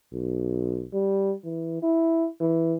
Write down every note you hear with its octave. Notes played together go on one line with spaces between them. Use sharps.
B1
G3
E3
E4
E3